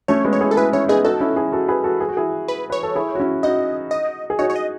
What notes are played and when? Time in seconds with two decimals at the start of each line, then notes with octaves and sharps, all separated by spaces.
0.08 A3 C#4 C#5
0.25 G#3 B3
0.33 C#5
0.41 E4 G#4
0.51 A4
0.57 E4 G#4 B4
0.72 C#4 E4 C#5
0.88 B3 D#4 G#4
1.04 D#4 F#4 A4
1.20 C#4 E4
1.36 E4 G#4
1.52 F#4 A4
1.68 G#4 B4
1.84 F#4 A4
2.00 G#4
2.09 F#4
2.17 E4 G#4
2.48 B4
2.70 B4 C#5
2.83 A4
2.95 E4 G#4
3.15 F#4
3.20 C#4 E4
3.43 D#4 F#4 D#5
3.91 D#5
4.30 G#4
4.39 D#4 F#4 C#5
4.50 C#5
4.56 D#5